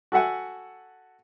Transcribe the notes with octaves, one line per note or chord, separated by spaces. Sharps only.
F#4 A4 E5 F#5 G#5